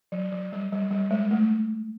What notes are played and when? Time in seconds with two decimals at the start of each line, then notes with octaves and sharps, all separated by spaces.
0.12 F#3
0.32 F#3
0.52 G3
0.72 G3
0.91 G3
1.11 G#3
1.31 A3